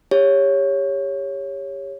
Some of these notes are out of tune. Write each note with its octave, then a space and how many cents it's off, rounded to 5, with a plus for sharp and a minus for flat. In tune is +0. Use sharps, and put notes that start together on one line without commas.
G4 +25 C#5 +0